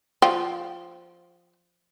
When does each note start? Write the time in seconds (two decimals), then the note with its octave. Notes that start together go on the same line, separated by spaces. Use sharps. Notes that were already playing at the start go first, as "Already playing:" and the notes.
0.22 F3 G5